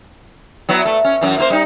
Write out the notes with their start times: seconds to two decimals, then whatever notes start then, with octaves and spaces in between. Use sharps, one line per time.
0.69 F#3 B3 E4
0.85 A3
1.04 C#4
1.21 F#2 E3
1.38 A#3 F4 C5
1.50 G3 D#4